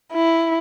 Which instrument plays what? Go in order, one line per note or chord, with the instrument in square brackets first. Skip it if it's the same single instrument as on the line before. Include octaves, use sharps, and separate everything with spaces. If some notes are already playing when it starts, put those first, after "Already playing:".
[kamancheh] E4